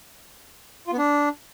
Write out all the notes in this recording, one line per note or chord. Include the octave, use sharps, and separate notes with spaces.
F4
B3
D4